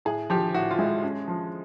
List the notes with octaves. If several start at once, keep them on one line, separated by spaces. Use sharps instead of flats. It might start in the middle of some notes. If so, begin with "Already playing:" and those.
A2 G#4
F3 G4
A2 F#4
F4
G#3 E4
C#4
F3